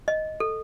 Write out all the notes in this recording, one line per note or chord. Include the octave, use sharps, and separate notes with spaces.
D#5
A4